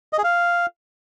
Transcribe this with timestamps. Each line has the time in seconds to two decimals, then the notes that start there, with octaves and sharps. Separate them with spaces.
0.13 D#5
0.18 G#4
0.24 F5